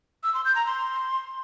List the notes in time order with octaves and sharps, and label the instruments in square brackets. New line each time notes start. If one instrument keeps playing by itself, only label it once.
[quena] E6
C6
G6
A#5
C6